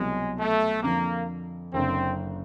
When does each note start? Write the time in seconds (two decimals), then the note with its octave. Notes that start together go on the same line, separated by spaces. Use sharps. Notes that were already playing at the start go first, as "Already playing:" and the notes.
Already playing: C2 B2 F#3 G#3
0.38 A3
0.83 F2 D3 F3 A#3
1.73 F#1 F#2 D3 C4